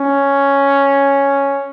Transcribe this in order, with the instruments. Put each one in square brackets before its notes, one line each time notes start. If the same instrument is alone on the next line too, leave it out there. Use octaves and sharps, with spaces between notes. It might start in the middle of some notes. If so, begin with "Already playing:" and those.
Already playing: [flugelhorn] C#4